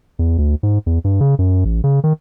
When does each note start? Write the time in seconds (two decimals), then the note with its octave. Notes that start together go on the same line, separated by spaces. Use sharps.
0.19 E2
0.38 D2
0.63 G#2
0.86 E2
1.04 G2
1.21 C#3
1.39 F#2
1.65 A1
1.84 C#3
2.04 D#3